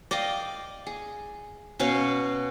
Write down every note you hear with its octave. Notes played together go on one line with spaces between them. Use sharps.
D5 D#5 F5 G5
G#4
B2 C#4 C#5 F5